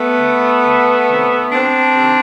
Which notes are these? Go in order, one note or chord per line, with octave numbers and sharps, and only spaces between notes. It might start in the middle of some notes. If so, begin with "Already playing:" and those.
Already playing: A3 B3
D3
D2
C3 D#3
D2 C4 D4
C3 D#3